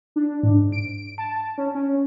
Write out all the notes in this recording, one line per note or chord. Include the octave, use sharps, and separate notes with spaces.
D4
G#2
D7
A5
C#4
C#4